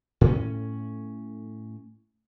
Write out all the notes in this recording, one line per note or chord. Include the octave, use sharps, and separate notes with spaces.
A2 C#4